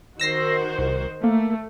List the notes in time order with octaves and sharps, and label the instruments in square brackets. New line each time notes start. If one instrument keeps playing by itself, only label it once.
[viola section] D#3 F#4 C5 [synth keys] E6 A#6 C7
[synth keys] C2
[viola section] A3 [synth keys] A#3